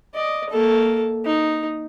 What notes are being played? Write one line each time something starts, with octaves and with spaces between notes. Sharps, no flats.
D5 D#5
A#3 A4
D#4